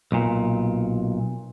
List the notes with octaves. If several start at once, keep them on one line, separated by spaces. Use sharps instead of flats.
B1 A#2